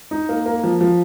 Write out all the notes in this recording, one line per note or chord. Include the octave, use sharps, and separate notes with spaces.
D#4
A#3
A#3
F3
F3